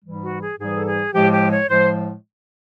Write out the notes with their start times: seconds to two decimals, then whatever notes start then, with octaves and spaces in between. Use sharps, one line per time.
0.05 G#2 E3 G3
0.23 F#4
0.41 G#4
0.59 G#2 E3 G3 G#4
0.75 A4
0.87 G#4
1.14 A2 F3 G#3 G4
1.33 G4
1.51 C#5
1.68 A2 F3 G#3 C5